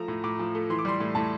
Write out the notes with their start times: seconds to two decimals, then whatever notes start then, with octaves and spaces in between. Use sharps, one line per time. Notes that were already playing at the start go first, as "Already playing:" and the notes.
Already playing: F3 A3 A#5
0.08 A2
0.24 A2 D6
0.39 F3
0.55 A3
0.70 E3 C6
0.79 D6
0.85 G3 C6
1.00 A2
1.15 A2 A5